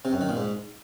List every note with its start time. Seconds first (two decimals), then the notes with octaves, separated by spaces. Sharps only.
0.05 C3
0.13 F#2
0.21 D#3
0.29 A#2
0.37 G#2